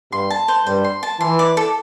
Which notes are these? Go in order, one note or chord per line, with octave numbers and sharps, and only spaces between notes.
G2 G3 C6
A5
C5
G2 G3 C5
C6
A5
E3 C6
D5
A4